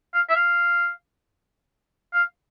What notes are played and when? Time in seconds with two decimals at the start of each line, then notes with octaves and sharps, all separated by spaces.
0.14 F5
0.30 E5
0.36 F5
2.13 F5